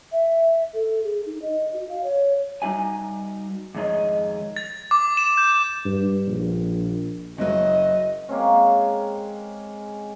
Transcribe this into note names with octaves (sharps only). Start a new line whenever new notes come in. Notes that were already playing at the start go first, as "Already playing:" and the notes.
E5
A4
G#4
D#4
D#5
F#4
F5
C#5
G3 D#4 F#4 G#5
F2 G#2 D#3 G#3 C#5 D#5
A6
D6
E7
G6
G2
A#1
F#1 F#3 D#5
G#3 A#3 C4 C#4